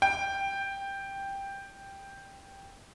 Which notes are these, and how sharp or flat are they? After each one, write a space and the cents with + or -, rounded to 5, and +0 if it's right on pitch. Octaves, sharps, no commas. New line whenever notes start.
G5 +5